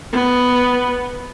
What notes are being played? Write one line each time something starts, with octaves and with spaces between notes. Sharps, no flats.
B3